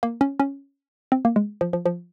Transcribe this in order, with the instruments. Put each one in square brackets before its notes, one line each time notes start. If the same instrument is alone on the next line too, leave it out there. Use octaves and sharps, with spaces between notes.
[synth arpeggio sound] A#3
C#4
C#4
C4
A#3
G#3
F3
F3
F3